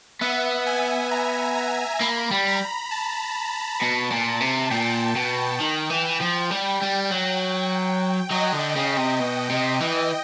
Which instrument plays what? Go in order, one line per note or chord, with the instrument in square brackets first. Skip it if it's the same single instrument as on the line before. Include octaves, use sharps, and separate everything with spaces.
[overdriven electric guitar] B3 [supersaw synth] E5
[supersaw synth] G#5
A#5
A#5
[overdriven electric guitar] A#3 [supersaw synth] B5
[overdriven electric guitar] G3
[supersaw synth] A#5
A5
[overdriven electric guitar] B2
A#2
C3
[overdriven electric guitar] A#2 [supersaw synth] G5
[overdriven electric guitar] B2
D#3
E3
F3
G3
G3
F#3
[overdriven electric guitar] F#3 [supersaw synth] D#5
[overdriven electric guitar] D3
C#3
C3
B2
C3
E3